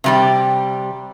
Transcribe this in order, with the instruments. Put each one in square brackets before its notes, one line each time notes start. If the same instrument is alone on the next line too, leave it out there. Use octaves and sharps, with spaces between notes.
[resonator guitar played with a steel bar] C3 G3 G4